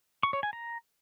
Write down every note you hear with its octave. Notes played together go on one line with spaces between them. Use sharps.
C#6
C#5
G#5
A#5